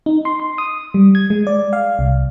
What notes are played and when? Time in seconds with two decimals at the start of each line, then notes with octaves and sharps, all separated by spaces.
0.06 D#4
0.25 C6
0.40 C6
0.58 D#6
0.94 G3
1.15 G#6
1.30 G#3
1.47 D5
1.73 F5
1.99 C2